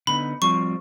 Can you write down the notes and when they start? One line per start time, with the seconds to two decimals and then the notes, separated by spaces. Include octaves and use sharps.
0.07 D3 B3 D#4 B5
0.42 F3 G3 C4 C#6